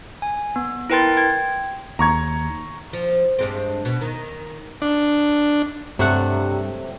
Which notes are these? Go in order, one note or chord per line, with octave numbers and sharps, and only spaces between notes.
G#5
B3
E4 A#4 B4 G5 C6 A6
G5 G#6
D#2 A#5 C#6 G#6
F3
G2 G#3 C4
B2
D#3
D4
G2 C3 F#3 G3 A3 F#5